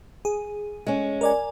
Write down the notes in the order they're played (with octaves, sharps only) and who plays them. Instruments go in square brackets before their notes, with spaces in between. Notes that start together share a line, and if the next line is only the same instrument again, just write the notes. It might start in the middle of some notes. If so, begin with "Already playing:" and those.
[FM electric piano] G#4
[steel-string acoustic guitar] G#3 C#4
[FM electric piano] A#4 D5 G#5